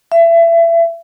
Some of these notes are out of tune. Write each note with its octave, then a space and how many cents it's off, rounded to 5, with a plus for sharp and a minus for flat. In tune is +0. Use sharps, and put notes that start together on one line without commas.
E5 +30